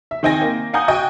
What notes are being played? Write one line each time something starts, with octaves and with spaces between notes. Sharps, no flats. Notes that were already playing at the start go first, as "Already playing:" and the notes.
E5
D#3 C4 D#4 G5 G#5 A#6
A#3
F5 F#5 G#5 A#5 D#6 G6
F#4 D#5 G5 G#5